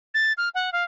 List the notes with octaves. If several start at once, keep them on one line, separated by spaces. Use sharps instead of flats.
A6
F6
F#5
F5